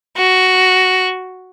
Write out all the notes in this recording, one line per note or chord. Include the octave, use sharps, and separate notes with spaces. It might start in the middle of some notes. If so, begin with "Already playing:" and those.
F#4